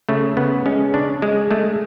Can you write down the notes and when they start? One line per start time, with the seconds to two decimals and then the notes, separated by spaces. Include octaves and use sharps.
0.09 C#3 A3
0.37 C#3 B3
0.66 G#3 C#4
0.94 C#3 D4
1.22 G#3
1.51 G#3 A3